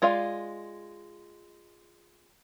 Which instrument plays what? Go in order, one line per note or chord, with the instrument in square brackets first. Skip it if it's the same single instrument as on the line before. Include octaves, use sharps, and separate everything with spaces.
[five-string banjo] G#3 F4 D5 F5